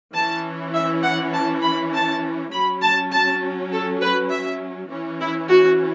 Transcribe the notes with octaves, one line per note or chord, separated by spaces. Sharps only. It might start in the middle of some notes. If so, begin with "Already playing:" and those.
E3 C#4 A5
E5
F#5
A5
B5
A5
F#3 C#4 B5
A5
A5
A4
B4
E5
E3 C#4 F#4
E4
F#4